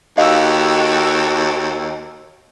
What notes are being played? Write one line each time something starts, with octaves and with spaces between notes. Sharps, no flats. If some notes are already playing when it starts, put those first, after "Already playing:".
D#2 F#4 G4 A4 D#5 F5 E6